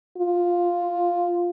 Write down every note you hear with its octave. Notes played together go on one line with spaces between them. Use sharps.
F4